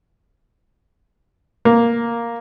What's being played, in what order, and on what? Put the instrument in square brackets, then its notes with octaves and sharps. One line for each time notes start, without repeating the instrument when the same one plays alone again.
[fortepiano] A#3